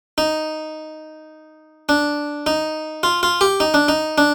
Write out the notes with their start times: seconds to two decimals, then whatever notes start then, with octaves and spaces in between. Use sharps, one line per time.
0.18 D#4
1.89 D4
2.46 D#4
3.03 F4
3.23 F4
3.41 G4
3.60 D#4
3.74 D4
3.88 D#4
4.18 D4